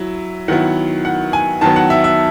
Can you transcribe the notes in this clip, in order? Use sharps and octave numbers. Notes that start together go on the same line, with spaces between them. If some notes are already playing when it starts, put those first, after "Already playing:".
Already playing: F#3 E4
D#3 F#3 B3 E4 F#5
F#5
G#5
D#3 F#3 B3 A5
F#5
E5
E5